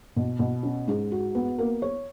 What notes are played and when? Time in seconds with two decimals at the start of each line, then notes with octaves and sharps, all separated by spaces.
0.16 B2
0.39 B2
0.63 C#4
0.88 G#2
1.12 F#4
1.35 B3
1.58 A#3
1.82 C#5